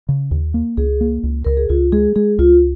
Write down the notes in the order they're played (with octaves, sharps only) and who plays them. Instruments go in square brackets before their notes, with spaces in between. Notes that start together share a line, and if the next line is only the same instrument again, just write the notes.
[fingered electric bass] C#3
D#2
A#3
[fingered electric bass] C#2 [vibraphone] G#4
[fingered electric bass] A#3
C#2
[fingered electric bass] C#2 [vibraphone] A#4
[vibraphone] G#4
[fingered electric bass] C#2 [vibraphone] F4
[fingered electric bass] G#3 [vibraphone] G#4
[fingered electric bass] G#3 [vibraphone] G#4
[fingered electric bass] C#2 [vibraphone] F4